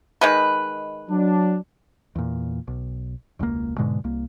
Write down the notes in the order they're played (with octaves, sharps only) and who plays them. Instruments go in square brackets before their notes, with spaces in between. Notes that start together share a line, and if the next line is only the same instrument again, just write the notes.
[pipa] D#3 G#3 B4
[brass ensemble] F#3 D4
[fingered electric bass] E2 A#2
B1
E1 C#2 D#3 A#3
G#2 B2 D3 G#3
C2 A#3